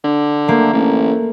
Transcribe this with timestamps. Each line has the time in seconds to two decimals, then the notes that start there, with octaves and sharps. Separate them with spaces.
0.04 D3
0.48 A3 A#3
0.73 A1